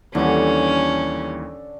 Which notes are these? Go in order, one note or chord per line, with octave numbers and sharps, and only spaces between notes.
D#2 D3 E3 G3 C#4 A4